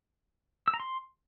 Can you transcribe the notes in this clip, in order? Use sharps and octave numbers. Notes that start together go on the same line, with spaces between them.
E6
A#5
C6